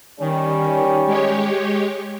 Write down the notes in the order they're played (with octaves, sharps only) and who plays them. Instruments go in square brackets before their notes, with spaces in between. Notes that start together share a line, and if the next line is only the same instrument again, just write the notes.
[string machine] D#3 [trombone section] G3 C#4
[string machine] G#3 G4 C#5